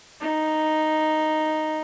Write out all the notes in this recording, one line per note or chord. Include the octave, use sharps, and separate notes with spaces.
D#4